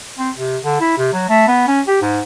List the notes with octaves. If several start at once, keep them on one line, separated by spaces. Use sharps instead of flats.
C4
C3
D3
E4
C3
F#3
A3
B3
C#4
G4
G#2